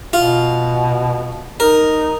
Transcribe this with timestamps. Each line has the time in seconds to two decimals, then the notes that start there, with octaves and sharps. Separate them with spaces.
0.13 B2 F4
1.60 D#4 A#4